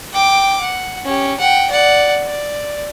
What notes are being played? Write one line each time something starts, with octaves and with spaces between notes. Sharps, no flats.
G5 D6
F#5
C#4 G4
F#5 G5
D5 F#5
D5